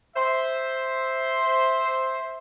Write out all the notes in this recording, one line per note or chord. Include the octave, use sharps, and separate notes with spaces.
C5 E5